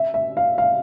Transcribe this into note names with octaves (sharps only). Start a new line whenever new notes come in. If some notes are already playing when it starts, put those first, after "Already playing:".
Already playing: E5
E5
F5
F5